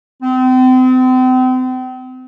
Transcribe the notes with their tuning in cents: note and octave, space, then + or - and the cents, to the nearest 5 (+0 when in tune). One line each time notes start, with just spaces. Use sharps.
C4 -35